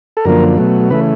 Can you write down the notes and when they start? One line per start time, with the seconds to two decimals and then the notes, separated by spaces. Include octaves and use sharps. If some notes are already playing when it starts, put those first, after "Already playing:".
0.17 A4
0.25 F#2 D3 F3 A#3 A#4
0.58 B2 F#3 A3
0.90 C#3 E3 A3 B4